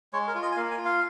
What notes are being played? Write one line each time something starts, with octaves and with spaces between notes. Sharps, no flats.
G#3 C#5
A#4
F4
D#5
G#5
A#3 F5
G#5
F4
F5